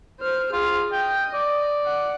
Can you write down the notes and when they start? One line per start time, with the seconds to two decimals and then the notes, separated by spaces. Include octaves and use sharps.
0.20 C5 F6
0.53 F4 G#4 F6
0.92 D#5 G5
1.34 D5
1.85 F#5